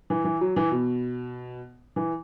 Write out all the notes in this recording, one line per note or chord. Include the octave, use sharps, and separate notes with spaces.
E3
E3
F#3
E3
B2
E3